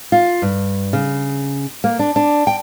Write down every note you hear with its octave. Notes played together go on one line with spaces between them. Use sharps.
F4
G2
C#3
A#3
D4
D4
G5